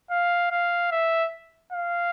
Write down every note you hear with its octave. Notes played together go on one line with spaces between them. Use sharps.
F5
F5
E5
F5